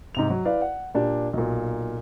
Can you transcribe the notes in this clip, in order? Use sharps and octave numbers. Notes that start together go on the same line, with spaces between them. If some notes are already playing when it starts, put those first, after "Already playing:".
G#2 C3 F7
F#3
E4 B4 D5 F5
F#5
A#2 D4 G4
B1 A#2